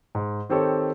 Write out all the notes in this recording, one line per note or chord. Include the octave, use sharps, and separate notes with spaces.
G#2
D#3 C4 G4 A4 C#5